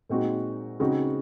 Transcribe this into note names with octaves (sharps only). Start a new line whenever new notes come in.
A#2 G#3 C4 D#4 F#4
C#3 G#3 C4 D#4 F#4